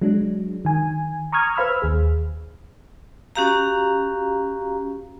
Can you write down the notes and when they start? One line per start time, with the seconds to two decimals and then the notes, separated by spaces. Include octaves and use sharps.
0.01 F#3 G#3 D4
0.65 D#3 G#5
1.32 A#5 C#6 D#6 F6 G#6
1.56 B4 C5 F5 B5 E6 F6
1.82 D#2 G#4
3.36 C#4 F#4 G4 F5 A#5